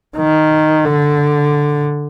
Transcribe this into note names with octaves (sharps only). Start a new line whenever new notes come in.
D#3
D3